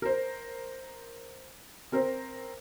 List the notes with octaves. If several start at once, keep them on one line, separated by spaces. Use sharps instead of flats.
A#4 C5
C4 A#4 C5